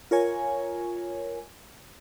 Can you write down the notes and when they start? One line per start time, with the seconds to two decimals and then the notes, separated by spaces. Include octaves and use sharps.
0.11 F4 A#4 C#5 G#5